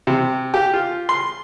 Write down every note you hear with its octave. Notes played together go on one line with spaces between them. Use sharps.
C3
G4
F4
C6